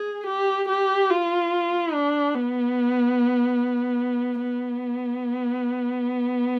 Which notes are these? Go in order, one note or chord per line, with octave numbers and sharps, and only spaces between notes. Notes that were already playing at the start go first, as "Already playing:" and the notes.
Already playing: G#4
G4
G4
F4
D4
B3
B3